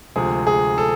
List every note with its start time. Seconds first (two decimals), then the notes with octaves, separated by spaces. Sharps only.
0.16 D2 C3 F3 G#3 C4 G#4
0.47 G#4
0.78 A4